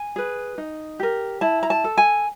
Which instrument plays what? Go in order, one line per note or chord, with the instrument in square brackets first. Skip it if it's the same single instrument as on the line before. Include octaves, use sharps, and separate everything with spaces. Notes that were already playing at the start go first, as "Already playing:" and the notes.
Already playing: [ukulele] G#5
G#4 B4
D#4
G4 A#4
E4 A5
A#5
A5
A4
G#5